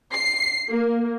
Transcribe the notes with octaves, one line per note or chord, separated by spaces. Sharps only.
C7
A#3